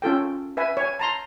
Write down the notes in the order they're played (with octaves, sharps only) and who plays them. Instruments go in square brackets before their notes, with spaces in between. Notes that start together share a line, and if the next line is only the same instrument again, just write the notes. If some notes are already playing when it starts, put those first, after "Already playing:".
[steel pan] C#4 F4 A4 G5
B4 E5 G#5
C#5 G#5
A5 A#5 C6